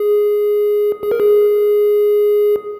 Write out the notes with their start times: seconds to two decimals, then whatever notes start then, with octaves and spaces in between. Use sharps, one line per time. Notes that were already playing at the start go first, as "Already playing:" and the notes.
Already playing: G#4
1.03 G#4
1.11 A#4
1.20 G#4